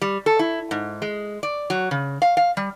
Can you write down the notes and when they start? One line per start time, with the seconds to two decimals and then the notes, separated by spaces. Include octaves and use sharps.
0.01 G3
0.26 A4
0.39 E4
0.71 G#2
1.02 G#3
1.43 D5
1.70 F#3
1.91 C#3
2.22 F5
2.37 F5
2.57 G3